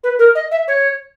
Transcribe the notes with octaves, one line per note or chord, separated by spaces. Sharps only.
B4
A#4
D#5
E5
C#5